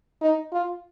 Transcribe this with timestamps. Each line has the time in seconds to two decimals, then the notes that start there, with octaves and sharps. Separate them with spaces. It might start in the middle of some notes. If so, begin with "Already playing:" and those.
0.22 D#4
0.52 F4